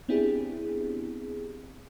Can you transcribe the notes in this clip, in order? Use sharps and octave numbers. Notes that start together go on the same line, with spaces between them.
B3 C4 D4 E4 G4 G#4